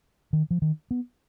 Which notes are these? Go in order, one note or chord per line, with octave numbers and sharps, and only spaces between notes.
D#3
F3
D#3
B3